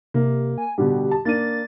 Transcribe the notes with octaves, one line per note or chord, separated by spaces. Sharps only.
C3 A#3
G#5
B2 D3 G3 G4
A5
A#3 D4 A6 D#7